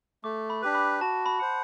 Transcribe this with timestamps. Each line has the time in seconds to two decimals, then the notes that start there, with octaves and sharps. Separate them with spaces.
0.24 A3 D6
0.50 B5
0.62 D4 G4 B4
0.75 B5
1.01 F#4 A5
1.26 B5
1.39 C5 F#5